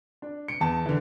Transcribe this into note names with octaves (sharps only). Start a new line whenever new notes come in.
D4
C#7 D7
E2 A5
D3 E3